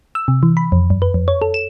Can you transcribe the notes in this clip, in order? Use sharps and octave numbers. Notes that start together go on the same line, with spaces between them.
E6
C3
E3
B5
F2
F#2
B4
F2
C#5
A4
E7